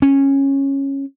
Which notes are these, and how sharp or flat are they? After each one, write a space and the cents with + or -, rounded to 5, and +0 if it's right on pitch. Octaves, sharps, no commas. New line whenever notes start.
C#4 -10